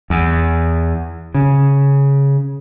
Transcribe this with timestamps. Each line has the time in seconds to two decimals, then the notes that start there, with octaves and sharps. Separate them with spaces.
0.10 E2
1.35 C#3